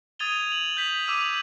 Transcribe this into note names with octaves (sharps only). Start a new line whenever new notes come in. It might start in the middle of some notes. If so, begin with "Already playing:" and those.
D#6 G#6 A6 D#7 F7 G7
F7 F#7
G6 B6 F#7
D6 E6 D#7 F7